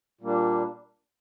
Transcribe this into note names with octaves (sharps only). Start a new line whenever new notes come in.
A#2 G3 A#3 D4